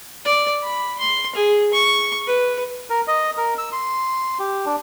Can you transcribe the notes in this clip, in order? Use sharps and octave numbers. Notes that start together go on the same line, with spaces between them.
D5
B5
C6
G#4
C#6
B4
A#4
D#5
A#4
E6
C6
G4
D4